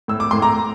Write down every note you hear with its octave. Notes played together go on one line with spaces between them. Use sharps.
A2 E6
D6
A2 C6
A#5 D6